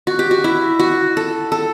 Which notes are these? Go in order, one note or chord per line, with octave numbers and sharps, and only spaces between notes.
F#4
G4
F#4
E4
F#4
A4
A4